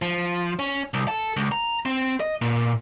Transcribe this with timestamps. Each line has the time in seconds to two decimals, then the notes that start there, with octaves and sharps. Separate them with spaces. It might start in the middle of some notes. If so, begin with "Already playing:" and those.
0.02 F3
0.59 C#4
0.94 C2
1.08 A4
1.37 C#2
1.52 A#5
1.86 C4
2.20 D#5
2.42 A#2